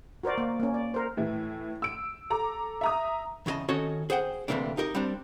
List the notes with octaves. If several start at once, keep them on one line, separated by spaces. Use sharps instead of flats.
F#4 A#4 C5 D5
A#3
A#3 C#4
D5
A#4 C5
A2 E3 E4
E6 D7
A4 A#5 D6
E5 A#5 D#6
E2 C#3 E4 D#5 A5
D#3 C#4 F#4 A4 C#5 D#5
G#4 C5 F#5 G5
D2 G2 C3 E3 A#3 D4
D#4 G4 A#4 D#5
G3 C4 D4